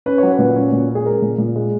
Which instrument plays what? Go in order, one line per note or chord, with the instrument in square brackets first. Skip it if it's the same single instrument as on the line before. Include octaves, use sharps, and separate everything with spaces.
[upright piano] C#4 B4
F#3 C#5
B4
A#2
C#4
A#2
C#4
G#4
G#3 A#4
A#2
A#2
G#3